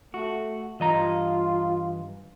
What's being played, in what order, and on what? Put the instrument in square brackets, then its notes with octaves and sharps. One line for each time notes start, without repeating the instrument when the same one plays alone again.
[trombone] A3 [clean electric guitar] F#4
[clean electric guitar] G2 D#5 A#5 [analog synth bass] E3 [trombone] F4